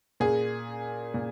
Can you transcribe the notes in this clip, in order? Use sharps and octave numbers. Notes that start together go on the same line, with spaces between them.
A#2 G#4
A#2